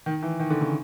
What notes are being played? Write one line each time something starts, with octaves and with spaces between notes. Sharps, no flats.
D#3
E3
D#3
D3
C#3